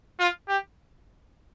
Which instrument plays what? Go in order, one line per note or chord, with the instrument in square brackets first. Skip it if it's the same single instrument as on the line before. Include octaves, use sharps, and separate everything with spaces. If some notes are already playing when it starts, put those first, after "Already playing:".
[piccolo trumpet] F4
G4